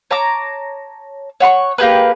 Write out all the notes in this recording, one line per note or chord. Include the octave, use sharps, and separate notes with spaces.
C#5 A5 A#5 D6
C#5 F#5 C6 C#6
A#3 G4 G#4 B4